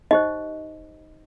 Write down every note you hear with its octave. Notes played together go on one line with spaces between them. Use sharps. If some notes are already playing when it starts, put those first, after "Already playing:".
D#4 G4 C5 D#5